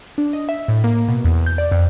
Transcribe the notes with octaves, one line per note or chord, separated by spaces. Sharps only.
D4
D#5
E5
A2
A#3
B2
E2
G6
D5
F2